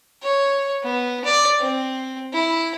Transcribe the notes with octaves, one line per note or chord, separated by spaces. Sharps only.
C#5
B3
D5
C4
E4